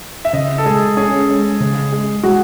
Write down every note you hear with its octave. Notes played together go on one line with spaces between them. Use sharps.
E5
C#3 D#5
A4
G#3 G#4
C#4 G#4
G#3
C#3
G#3
G#3 F#4